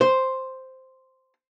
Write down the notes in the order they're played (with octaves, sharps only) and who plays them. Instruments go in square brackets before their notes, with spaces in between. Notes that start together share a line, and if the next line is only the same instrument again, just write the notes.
[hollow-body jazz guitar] C5